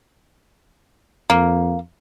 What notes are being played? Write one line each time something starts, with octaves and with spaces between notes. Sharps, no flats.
F2 A#3